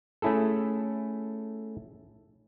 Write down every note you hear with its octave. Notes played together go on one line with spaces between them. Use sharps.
A3 C#4 E4 G#4 A4